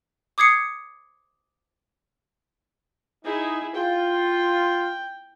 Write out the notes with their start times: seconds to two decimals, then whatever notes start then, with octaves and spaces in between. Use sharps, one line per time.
0.38 D6 D#6 G#6 C7 C#7
3.24 D#4 E4 G#4
3.74 F4 G5